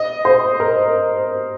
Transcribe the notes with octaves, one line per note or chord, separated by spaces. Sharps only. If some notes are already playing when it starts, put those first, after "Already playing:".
Already playing: D#5
C5
A#4